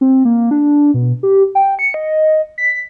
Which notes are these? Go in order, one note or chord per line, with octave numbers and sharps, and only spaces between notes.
C4
A#3
D4
B2
G4
G5
C#7
D#5
B6